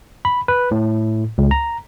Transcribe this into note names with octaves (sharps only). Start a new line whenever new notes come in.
B5
B4
A2
C#2
A#5